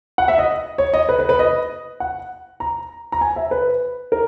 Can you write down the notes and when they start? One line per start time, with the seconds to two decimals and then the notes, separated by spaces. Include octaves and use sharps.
0.18 F#5
0.28 E5
0.38 D#5
0.78 C#5
0.94 D#5
1.09 B4
1.19 B4
1.29 B4
1.39 D#5
2.00 F#5
2.60 A#5
3.12 A#5
3.21 G#5
3.36 E5
3.51 B4
4.12 A#4